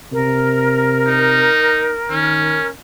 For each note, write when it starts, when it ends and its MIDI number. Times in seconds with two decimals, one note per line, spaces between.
0.12 1.48 48
0.12 2.68 70
1.07 1.93 63
2.10 2.58 51
2.10 2.68 61